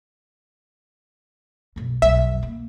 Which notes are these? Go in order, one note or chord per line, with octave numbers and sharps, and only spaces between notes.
B1 F#2
B1 F2 E5
A#3